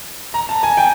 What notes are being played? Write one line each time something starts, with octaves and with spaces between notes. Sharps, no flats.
A#5
A5
G#5
G5